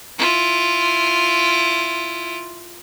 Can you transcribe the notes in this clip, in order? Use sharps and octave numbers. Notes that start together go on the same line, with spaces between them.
E4 F4